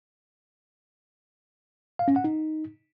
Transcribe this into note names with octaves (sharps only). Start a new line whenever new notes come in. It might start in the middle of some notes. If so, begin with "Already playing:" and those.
F5
C#4
F#5
D#4